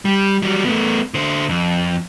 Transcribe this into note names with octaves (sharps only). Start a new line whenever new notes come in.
G3
F#3 G3
A3 B3
D3 C5
F2